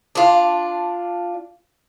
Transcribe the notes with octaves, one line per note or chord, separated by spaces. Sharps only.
D4 F4